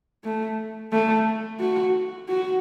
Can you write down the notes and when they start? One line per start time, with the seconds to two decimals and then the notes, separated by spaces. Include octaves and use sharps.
0.24 A3
0.92 A3
1.60 F#4
2.28 F#4